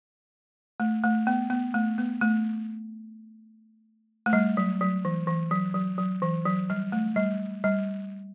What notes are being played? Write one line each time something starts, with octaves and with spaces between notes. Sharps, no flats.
A3
A3
B3
B3
A3
B3
A3
A3
G3
F#3
F#3
E3
E3
F#3
F#3
F#3
E3
F#3
G3
A3
G3
G3